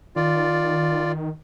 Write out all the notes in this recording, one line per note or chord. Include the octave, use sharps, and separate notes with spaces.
D#3 F4 D5